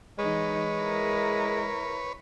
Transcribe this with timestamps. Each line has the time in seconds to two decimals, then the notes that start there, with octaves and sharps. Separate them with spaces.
0.19 E3 G#3 D#4 B4 C#5
0.80 E4 A#4